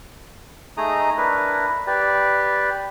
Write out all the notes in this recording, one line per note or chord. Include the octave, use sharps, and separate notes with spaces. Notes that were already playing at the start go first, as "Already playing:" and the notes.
A3 D#4 G#4 D#5 A#5 D#6
D4 E4 A#4 B4
G4 B4 D5